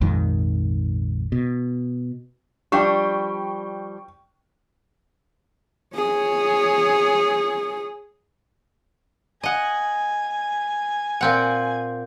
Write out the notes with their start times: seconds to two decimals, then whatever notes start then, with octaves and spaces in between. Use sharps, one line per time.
0.01 A#1 F2 G#2 D#3
1.32 B2
2.72 F3 G3 D4 G5 C#6
5.96 G#4 C#5
9.43 D#5 F#5 G#5
11.21 A#2 C4 F#5